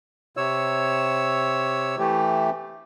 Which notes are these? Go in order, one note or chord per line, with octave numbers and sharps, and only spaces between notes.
C3 C#5 E6
E3 A3 G4